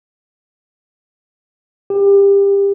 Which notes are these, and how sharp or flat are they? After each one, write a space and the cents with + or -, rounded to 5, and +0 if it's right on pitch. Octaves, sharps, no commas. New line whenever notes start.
G4 +25